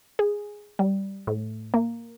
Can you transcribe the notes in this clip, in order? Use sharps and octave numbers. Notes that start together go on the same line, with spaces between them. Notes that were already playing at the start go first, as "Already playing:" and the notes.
G#4
G3
A2
A#3